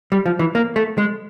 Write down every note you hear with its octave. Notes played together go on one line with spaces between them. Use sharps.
G3
F3
E3
A#3
A3
G#3